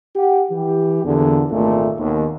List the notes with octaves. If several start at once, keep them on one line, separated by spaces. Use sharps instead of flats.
G4 F#5
E3 G4
E2 A#2 D3
G#1 A#2 G#3 A3
D#2 B2